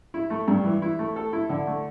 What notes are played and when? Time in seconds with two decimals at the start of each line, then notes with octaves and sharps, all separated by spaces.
0.14 E4
0.30 A3
0.48 G2
0.64 E3
0.82 E4
0.99 A3
1.16 A4
1.33 E4
1.49 D3
1.67 A3